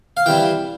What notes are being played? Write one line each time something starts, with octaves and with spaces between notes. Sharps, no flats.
F5
E3 G3 C4 G5